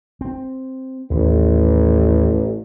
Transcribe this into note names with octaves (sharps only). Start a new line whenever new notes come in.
C4
A1 D#2